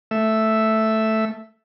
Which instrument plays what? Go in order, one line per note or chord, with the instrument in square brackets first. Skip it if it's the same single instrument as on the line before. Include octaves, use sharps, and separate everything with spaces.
[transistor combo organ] A3 E5